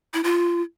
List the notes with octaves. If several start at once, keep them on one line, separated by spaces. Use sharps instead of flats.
E4
F4